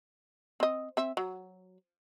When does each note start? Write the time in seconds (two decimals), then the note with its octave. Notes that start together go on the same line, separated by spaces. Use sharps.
0.60 C4 D#5
0.97 C4 E5
1.17 F#3